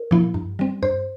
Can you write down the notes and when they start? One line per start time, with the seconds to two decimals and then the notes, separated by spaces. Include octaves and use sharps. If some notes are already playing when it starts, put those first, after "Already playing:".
Already playing: A#4
0.11 A#2 F3 A#3 E4
0.34 G2
0.59 G3 C4
0.82 G2 C5